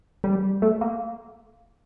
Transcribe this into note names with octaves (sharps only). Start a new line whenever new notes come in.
G3
A3
A#3